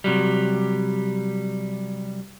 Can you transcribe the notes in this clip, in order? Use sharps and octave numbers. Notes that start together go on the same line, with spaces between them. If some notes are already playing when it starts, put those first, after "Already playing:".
C3 F#3 G3